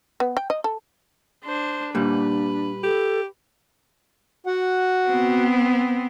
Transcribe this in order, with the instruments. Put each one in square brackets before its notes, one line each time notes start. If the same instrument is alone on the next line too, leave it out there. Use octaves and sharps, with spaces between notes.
[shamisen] B3
G5
D#5
A4
[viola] D4 C5
[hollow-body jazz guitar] A#2 G3 [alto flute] D4 [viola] B4
[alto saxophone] G4 [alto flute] A4
[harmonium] F#4 F#5
[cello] B3 C4